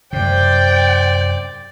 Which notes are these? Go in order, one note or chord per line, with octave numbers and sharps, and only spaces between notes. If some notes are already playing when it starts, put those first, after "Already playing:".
F#2 C3 C5 D5 G5